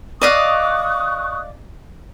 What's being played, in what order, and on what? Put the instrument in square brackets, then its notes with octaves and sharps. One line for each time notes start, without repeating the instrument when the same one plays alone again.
[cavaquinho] D5 D#5 F5 [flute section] C#6 D#6 F#6